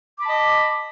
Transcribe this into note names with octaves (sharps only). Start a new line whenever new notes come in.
D#5 A5 B5 D6